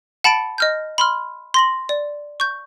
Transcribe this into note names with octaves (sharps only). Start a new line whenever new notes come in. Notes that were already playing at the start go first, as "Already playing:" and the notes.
F#5 A5 B5 A6 C#7 D7
D#5 F6 G6
B5 C6 F6
C6 A#6 F#7
D5
C#6 G6